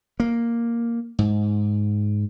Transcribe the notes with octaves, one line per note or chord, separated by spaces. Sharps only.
A#3
G#2